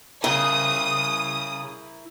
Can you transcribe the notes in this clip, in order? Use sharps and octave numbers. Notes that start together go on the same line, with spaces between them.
C#3 E4 A#4 D#6